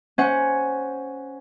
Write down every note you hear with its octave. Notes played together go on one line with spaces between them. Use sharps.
C#4 C5 F#5